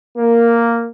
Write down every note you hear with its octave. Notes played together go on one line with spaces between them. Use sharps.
A#3